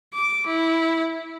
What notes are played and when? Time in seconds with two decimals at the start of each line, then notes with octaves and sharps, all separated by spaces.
0.14 D6
0.46 E4